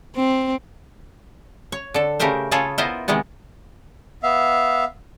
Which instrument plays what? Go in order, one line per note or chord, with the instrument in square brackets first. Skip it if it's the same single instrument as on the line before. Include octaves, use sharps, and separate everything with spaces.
[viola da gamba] C4
[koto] C#5
D3 A4
C#3 A3 G4 A#4 C5
C#3 F4 G#4 A4 C#5
B3 E4 F4 A#4 C5 D#5
C3 D#3 E3 G#3 B3
[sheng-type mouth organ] B3 E5 F5